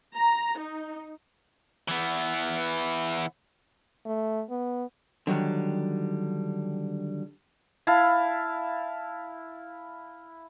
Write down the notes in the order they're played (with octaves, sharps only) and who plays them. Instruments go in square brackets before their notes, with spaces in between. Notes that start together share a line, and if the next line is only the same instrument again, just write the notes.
[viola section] A#5
D#4
[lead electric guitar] E3 B3
[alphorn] A3
B3
[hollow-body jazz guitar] D3 D#3 F#3 G3
[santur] E4 F5 A5